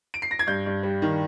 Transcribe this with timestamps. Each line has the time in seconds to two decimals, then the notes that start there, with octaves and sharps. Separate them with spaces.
0.14 D7
0.22 C7
0.31 A#6
0.39 G#6
0.47 G2 G6
0.66 G2
0.83 G3
1.02 D#3